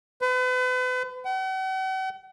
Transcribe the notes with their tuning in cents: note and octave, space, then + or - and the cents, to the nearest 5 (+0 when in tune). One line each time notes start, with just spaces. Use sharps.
B4 +40
F#5 +45